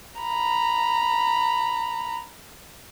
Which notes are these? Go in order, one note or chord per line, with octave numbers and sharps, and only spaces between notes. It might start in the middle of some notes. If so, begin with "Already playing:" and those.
A#5 B5